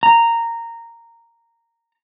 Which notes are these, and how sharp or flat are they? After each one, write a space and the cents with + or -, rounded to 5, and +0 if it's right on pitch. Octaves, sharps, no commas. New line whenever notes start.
A#5 -10